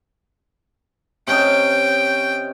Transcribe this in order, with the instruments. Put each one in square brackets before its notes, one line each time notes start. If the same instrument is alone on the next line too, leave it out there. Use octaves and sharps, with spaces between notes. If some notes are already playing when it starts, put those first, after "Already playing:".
[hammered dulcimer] C3 C#4 D#5 [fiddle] G5